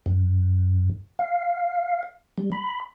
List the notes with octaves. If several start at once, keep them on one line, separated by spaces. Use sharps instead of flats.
F#2
F5
G3
B5